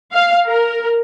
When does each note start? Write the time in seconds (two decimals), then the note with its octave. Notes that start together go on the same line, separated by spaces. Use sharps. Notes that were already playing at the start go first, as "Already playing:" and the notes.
0.12 F5
0.46 A#4